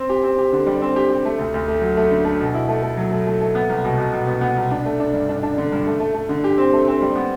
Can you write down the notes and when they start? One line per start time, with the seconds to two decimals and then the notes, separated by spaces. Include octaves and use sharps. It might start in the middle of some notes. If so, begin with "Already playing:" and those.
Already playing: C4
0.09 G4
0.24 C4
0.38 G4
0.52 D3
0.67 G3
0.82 C4
0.96 G4
1.10 G4
1.25 A3
1.39 D2
1.54 D2
1.68 A3
1.81 F#3
1.97 A3
2.11 D3
2.25 A3
2.40 B2
2.54 E4
2.69 A3
2.82 A3
2.97 F#3
3.12 A3
3.27 A3
3.41 A3
3.55 B3
3.69 C2
3.85 B2
3.98 B2
4.13 B2
4.27 B3
4.41 B3
4.56 C2
4.71 D4
4.86 A3
5.00 D4
5.14 G2
5.29 D4
5.43 D4
5.58 D3
5.72 G2
5.87 A3
6.00 A3
6.14 A3
6.29 D3
6.44 G4
6.58 C4
6.73 A3
6.88 C4
7.02 G3
7.16 B3